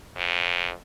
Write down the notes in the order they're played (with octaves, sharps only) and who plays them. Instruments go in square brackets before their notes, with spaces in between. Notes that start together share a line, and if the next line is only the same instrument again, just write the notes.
[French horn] F2